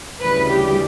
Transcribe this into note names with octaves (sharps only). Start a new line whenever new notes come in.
D2 C#3 E3 G3 B4
G4